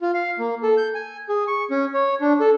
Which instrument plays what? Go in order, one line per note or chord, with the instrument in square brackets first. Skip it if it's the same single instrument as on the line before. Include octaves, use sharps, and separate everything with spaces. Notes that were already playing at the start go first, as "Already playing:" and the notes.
[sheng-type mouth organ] F4
F5
A#3
A4
G6
G#5
G#4
C#6
C#4
C#5
D4
A4